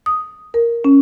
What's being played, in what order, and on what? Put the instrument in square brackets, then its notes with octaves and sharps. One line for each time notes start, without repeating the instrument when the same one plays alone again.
[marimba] D#6
A#4
C#4